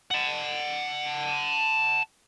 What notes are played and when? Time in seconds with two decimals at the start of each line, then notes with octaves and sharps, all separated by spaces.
0.11 F#5 A5